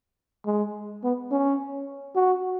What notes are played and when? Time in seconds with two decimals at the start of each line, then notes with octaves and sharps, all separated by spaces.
0.46 G#3
1.03 B3
1.32 C#4
2.16 F#4